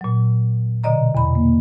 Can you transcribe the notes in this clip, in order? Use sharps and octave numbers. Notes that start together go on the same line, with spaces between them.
A#2 F#3
B2 D3 D5 D#5 A#5
E2 B5
A#3